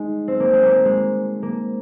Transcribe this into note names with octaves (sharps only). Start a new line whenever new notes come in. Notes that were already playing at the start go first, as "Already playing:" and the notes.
Already playing: G#3 D#4
C4
A#3
G#3
A#3
G#3
A#3